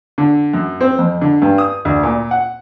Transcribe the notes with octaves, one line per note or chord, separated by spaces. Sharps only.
D3
F#2
C4
F2
D3
G2
D#6
D2
A#2
F#5